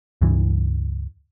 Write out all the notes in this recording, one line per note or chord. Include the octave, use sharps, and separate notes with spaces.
C#2 G2 E3